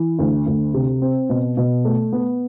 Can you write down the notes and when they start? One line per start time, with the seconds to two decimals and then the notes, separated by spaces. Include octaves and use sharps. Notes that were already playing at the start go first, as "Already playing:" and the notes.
Already playing: E3
0.19 D2
0.46 D2
0.74 C3
1.02 C4
1.30 B2
1.57 B2
1.85 A3
2.12 B3